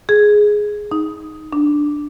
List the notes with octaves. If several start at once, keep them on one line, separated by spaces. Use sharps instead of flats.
G#4
D#4
D4